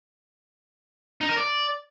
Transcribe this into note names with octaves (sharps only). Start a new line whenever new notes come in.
D#4
A#4
D5